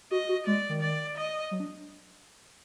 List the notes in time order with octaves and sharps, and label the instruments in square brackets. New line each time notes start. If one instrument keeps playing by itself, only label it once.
[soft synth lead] F#4 [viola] D#5
[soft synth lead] F#4
[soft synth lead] G#3 [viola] D5
[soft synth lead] D#3
[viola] D5
D#5
[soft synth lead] F#3
D4